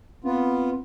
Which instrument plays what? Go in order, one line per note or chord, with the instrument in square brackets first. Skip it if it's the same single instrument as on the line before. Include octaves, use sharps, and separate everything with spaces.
[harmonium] B3 F4 [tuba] C4